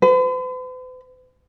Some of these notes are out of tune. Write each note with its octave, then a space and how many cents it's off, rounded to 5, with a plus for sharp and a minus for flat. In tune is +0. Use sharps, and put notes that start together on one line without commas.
B4 +45